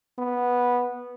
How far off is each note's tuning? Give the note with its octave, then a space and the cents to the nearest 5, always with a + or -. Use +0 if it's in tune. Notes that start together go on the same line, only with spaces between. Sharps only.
B3 -10